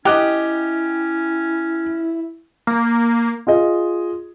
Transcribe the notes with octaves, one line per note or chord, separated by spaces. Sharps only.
C#4 E4 G4 D#5 G5 D6 F#6
A#3
F4 G#4 D#5